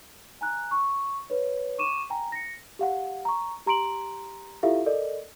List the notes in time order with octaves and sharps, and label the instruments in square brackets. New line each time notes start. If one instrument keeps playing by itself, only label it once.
[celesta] G#5 A#5 F#6
C#6
B4 C#5
C#6 D6 D#7 E7
G5 G#5 A#5
A#6 C#7
G4 F5 F#5
A#5 C#6
G4 A#5 C6 D7 F#7
E4 F4 G4 A4 E5 F5
A4 A#4 D5 D#5